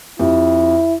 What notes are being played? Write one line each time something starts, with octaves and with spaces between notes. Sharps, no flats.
F2 E4 G4